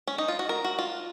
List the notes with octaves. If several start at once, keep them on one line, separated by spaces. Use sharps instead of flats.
C#4
D#4
F4
F#4
A#4
F#4
F4